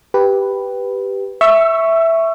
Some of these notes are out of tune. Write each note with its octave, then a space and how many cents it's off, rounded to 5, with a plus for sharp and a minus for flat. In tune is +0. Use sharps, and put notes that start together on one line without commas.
G4 +0 B4 +0
E5 +0 C#6 +0 E6 +30